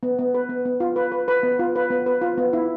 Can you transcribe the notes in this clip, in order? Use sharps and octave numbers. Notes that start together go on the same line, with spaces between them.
B3
B3
B4
B3
B3
F4
B4
B4
B4
B3
F4
B4
B3
B4
F4
B3
E4